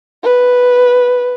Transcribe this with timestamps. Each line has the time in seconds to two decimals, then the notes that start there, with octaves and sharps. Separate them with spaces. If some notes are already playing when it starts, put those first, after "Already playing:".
0.23 B4